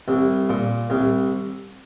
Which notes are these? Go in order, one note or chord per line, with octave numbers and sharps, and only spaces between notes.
C2
A#2
C2